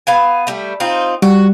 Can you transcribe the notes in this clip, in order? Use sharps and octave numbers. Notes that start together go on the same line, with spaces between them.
B3 F5 G#5
G3 A3
C4 D#4 F4
G3 F#4